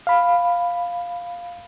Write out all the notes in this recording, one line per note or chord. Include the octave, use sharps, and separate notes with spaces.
F5 B5